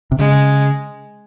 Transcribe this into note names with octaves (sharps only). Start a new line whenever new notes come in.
C3
C#3 G#3